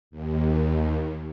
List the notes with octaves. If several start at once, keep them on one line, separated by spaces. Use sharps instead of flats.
D#2